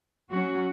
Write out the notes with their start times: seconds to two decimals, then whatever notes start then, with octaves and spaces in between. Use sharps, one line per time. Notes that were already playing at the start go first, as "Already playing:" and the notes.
0.29 F#3 C#4 F#4